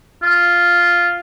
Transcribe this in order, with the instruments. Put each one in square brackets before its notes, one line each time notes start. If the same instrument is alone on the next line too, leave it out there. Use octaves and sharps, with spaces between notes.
[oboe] F4